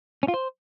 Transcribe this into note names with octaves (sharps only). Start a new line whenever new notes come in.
C#4
F4
C5